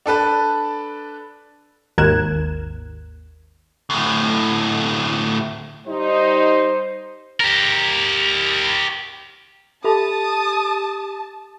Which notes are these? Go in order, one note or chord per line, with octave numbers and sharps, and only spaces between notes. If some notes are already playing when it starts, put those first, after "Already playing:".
D4 A4 B4 A5
G#1 D#2 A#4 F#6 G#6 E7
D2 A2
G3 D#4 C5
G4 A#4
G4 A4 E5 A5 B5 D#6